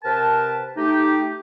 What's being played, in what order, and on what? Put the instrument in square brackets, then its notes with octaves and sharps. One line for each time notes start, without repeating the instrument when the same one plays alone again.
[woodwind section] C3 A#4 B4 G5 A5
A3 D#4 G4